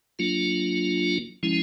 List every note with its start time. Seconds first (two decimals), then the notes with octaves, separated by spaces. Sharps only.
0.19 F#3 A#3 D4 F4
1.43 F3 G#3 C#4 E4